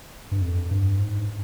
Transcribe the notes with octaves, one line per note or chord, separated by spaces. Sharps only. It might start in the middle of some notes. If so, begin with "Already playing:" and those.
G2
F2
G2
G#2